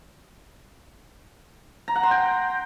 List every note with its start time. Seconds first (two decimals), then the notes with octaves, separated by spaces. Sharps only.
1.88 A#5
1.96 F#5
2.03 C6
2.11 G5